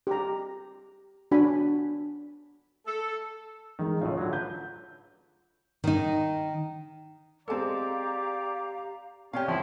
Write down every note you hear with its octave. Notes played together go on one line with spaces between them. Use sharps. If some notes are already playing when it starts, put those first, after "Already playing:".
G4 A#5
D4 F#4 G#5 B5
A4
D#3 E3 G#3 D#4
A2 C#3 F4
D3 F#3
B4 G6
D#3 D#4
G#3 C4 G4 A4 D5 F5 A5 A#5
C3 C#4 G4 C#5 D5 F5 G#5 F6
C#2 F3 E4 C6